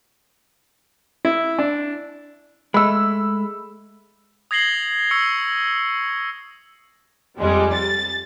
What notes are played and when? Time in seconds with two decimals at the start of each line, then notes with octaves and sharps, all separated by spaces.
1.25 E4
1.59 D4
2.74 G#3 A3 B5 E6
4.51 D#6 G#6 A#6 C7 F#7 G7
5.11 C#6 E6 C#7
7.39 F2 G3 G#3
7.72 A6